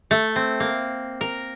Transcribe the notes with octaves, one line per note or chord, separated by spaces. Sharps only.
A3
C4
A#3
A#4